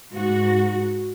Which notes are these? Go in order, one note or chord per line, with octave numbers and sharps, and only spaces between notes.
G#2 F#4